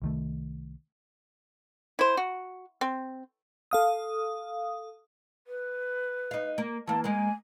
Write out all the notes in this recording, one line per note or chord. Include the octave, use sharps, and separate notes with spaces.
C2 D#3 A3
E4 C5
F#4
C4
A4 F5 D#6
B4
D#4 F5
A#3
E3 A#3 A5
G#3 A#3 G#5